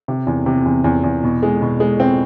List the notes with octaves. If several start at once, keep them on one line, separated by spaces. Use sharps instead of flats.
C3
E2
C3
E2
E2
E2
B2
G#3
B2
G#3
C4